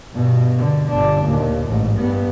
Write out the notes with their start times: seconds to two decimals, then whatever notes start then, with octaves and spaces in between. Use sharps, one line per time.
0.14 G2 B2
0.57 D3
0.90 G1 D4
1.25 D#2 A#2
1.67 A1 G#2
1.98 G2 B3